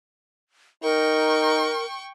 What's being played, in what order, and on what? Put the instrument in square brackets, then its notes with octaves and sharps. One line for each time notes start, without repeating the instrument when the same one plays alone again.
[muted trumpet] D#4 [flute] A#4 [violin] G5 C#6